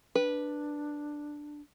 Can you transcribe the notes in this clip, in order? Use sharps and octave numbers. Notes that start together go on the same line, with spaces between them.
D4 B4